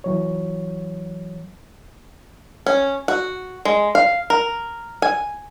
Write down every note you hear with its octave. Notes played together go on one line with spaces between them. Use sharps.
E3 F#3 C#5
C#4
F#4
G#3
F5
A#4
G#5